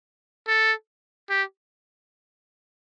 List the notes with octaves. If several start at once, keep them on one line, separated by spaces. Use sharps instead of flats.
A4
G4